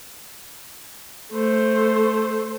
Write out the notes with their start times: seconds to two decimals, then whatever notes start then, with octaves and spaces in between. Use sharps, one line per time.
1.32 A3 C5